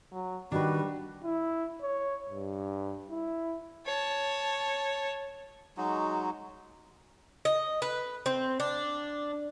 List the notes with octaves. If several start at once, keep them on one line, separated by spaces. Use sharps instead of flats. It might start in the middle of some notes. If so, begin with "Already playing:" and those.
F#3
D#3 G3 D4 F#4 B4
E4
C#5
G2
E4
C#5 A5
F#3 G#3 D#4 F#4
D#5
B4
C4
D4